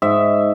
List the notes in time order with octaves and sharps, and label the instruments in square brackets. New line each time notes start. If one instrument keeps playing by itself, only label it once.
[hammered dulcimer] G#2 E5